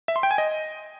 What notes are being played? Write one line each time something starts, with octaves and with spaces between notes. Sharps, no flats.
E5
C6
G5
G#5
D#5